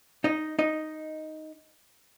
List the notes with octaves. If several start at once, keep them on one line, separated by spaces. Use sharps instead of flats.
D#4 D#5
D#4 D#5